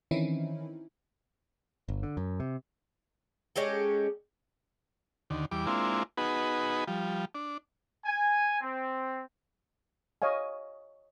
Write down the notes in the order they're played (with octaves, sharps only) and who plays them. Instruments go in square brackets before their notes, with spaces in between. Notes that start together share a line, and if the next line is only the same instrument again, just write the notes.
[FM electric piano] D#3 E3 C4 C#4 D#4 E4
[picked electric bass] G1
D3
F#2
C3
[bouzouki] G#3 C#4 G4 A4
[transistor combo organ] D#2 D3
E2 G3 D6
G#3 A#3 C4 D4 E4 F4
B3 D#4 F#4 G#4 B4
F3 G3
D4
[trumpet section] G#5
C4
[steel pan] C#5 D#5 F5 G#5